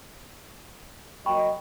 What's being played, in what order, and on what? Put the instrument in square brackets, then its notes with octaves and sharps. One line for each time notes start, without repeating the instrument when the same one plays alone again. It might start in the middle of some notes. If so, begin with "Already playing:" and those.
[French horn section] F#3 A#3 D#5 [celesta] G5 B5 C#6